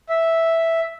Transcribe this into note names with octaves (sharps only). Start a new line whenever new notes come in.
E5